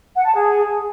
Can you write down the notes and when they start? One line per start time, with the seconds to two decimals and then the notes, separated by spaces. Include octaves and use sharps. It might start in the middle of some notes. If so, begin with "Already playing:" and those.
0.15 F#5
0.25 A5
0.34 G#4